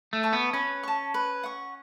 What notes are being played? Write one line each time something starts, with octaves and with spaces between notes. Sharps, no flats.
A3
A5 C#6
B3
C#4 B4
A5 C#6
B4
F#5 C#6